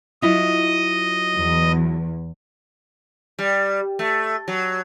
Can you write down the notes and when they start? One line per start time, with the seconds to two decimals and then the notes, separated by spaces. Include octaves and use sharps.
0.22 F#3 E4 F4 D#5
1.36 E2
3.39 G3
3.99 A3
4.48 F#3